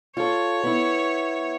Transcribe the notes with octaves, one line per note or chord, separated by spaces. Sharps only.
F4 A4 C#5
B3 E4